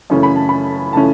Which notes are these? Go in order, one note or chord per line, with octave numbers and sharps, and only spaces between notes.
F#2 C#3 E3 A3 C#4
B5
A5
B5
C#3 E3 A3 C#4 A5